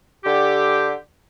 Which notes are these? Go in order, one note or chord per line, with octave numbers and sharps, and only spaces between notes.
D3 G4